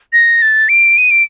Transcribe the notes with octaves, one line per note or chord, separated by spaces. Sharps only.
A#6
A6
D7
D#7
D7